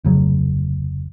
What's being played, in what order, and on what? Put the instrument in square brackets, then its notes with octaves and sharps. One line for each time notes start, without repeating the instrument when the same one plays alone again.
[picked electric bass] F1 D2 C#3 F#3